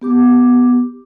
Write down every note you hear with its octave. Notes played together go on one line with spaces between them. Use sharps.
B3 G4 D6